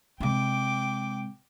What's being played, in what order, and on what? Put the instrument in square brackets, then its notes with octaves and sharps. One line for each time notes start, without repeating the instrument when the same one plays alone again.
[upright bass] C3 G#3 [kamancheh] G5 D6